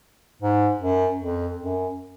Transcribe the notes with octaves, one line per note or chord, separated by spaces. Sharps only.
G#2
F#2
F2
F#2